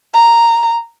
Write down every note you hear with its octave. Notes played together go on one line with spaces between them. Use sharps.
A#5